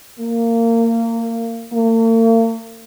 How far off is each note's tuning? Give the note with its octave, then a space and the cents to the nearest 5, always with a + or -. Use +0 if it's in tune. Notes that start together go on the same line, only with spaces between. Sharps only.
A#3 -25
A#3 -45